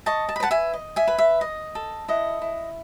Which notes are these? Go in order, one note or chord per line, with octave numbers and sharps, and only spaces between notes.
D#5 A5 C#6
A5
B5
B4 F#5 A5
E5 G#5
D#5
E5 G#5
B4
E5
D#5
A4
E4 D#5 F#5
E4